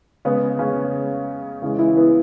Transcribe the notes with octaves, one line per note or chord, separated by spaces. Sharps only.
C#3 G#3 B3
C#3 C#4
C#3 E3 G#3
E3 E4
B3